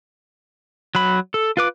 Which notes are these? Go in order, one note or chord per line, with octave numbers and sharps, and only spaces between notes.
F#3 B5
A4
F4 B4 D6